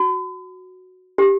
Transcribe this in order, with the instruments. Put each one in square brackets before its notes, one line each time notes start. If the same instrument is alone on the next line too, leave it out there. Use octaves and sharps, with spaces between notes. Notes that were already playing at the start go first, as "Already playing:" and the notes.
Already playing: [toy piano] F#4
G4